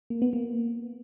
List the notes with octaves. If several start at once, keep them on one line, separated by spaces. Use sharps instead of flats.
A#3
B3
A#3